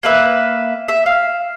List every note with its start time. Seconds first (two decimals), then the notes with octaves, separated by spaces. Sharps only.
0.03 A#3 B4 E5
0.88 E5
1.06 F5